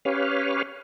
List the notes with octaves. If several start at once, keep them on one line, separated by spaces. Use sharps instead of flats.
C#4 G4 B4 C#5 F5